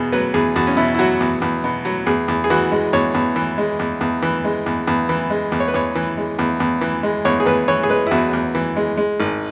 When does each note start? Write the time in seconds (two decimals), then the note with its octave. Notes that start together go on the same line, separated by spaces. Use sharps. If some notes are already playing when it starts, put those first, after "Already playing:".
Already playing: E2 B2 G#4
0.12 F#3 B4
0.34 E2 G#4
0.56 E2 F#4
0.67 C#4
0.77 B2 E4
0.95 E4
0.99 F#3 F#4
1.20 E2
1.42 E2
1.64 B2
1.85 F#3
2.06 E2 G#4
2.28 E2
2.44 G#4
2.50 E3 F#4
2.72 G#3
2.93 E2 C#5
3.14 E2
3.36 E3
3.58 G#3
3.79 E2
4.01 E2
4.22 E3
4.45 G#3
4.66 E2
4.87 E2
5.09 E3
5.30 G#3
5.52 E2
5.60 C#5
5.68 B4
5.74 E2 C#5
5.95 E3
6.18 G#3
6.39 E2
6.60 E2
6.81 E3
7.03 G#3
7.25 E2 C#5
7.40 G#4
7.46 E2 B4
7.68 E3 C#5
7.83 G#4
7.90 G#3 B4
8.07 E4
8.11 E2 F#4
8.33 E2
8.55 E3
8.76 G#3
8.97 G#3
9.20 G#1